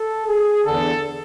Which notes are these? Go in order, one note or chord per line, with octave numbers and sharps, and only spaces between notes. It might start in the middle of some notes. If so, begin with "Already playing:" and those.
Already playing: A4
G#4
E2 D3 A4